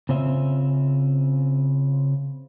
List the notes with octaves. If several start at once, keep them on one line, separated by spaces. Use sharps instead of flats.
C#3 C4 C#4 F4 C5 E5